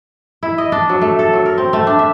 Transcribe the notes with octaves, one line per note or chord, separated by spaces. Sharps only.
E4
D#5
D4
F#3
A3
A4
F#3
A#4
C4
A3
D4
E5